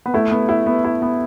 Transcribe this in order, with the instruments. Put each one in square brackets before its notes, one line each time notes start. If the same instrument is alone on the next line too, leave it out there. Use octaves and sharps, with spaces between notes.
[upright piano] B3
[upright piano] A3 [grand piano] E4
[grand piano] B3
E4
B3
E4
B3